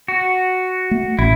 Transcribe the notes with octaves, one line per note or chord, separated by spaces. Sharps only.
F#4
A3
A1 E4